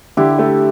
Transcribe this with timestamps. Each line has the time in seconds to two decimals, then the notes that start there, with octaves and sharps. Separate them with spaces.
0.17 D3 E4 G4
0.39 A3